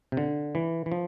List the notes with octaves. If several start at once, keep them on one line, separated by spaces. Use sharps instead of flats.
C3
D3
E3
E3
F3